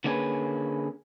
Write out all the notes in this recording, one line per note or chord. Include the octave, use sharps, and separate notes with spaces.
D3 A#3 B3 C#4 G#4 B4